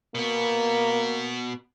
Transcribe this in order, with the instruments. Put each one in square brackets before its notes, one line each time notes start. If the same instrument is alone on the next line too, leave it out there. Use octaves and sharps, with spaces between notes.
[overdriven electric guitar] B2 B3 [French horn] A#3